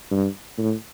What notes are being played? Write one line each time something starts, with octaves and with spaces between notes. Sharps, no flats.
G2
A2